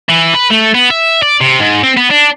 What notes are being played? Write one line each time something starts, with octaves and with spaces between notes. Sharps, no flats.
E3
B4
A3
B3
E5
D5
C3
G#2
C4
B3
D4